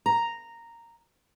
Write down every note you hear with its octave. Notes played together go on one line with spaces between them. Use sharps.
A#5